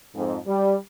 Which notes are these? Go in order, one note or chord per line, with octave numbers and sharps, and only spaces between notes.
F2 G#2
G3